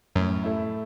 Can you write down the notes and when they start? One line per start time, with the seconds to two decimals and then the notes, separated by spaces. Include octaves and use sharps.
0.15 F#2 A2
0.44 A3 E4